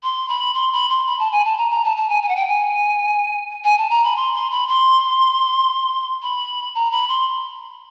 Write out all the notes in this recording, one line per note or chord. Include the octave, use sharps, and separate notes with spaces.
C6
B5
C6
B5
C6
B5
A5
G#5
A5
A#5
A#5
A5
A5
G#5
G#5
F#5
G5
G#5
G#5
A5
A#5
B5
C6
C6
B5
C6
B5
A#5
B5
C6